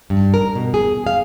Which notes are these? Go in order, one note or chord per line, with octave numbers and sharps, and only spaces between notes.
G2
A#4
B2
G#4
F5